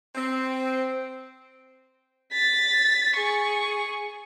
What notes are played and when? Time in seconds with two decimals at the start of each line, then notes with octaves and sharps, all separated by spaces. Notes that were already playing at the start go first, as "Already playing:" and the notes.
0.15 C4
2.33 A6 B6
3.16 G#4 C#6